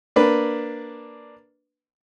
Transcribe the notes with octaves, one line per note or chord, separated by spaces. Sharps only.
A#3 D4 B4